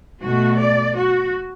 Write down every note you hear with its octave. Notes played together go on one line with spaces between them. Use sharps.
B2 A3 F#4
D5
F#4